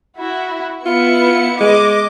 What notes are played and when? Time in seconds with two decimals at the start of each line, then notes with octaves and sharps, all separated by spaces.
0.18 E4 F#4
0.86 B3 E4 F4 C#7
1.61 G#3 D#5 D6